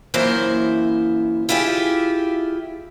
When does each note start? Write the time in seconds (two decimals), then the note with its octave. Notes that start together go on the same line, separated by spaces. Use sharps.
0.14 F#2 E3 A#3 E4 C5 E5
1.49 E4 F4 G4 G#4 E5